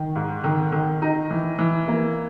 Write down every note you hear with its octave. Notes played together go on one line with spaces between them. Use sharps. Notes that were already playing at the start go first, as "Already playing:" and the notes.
Already playing: D#3
G#2
D#3
D#3
D#4
E3
E3
A#3